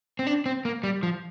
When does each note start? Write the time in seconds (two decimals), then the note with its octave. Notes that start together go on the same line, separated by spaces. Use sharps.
0.19 C4
0.27 D4
0.46 C4
0.65 A#3
0.83 G3
1.03 F3